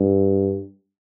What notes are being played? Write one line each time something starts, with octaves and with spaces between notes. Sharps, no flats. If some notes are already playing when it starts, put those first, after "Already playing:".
Already playing: G2